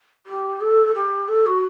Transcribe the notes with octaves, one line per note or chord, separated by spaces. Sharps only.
G4
A4
G4
A4
F#4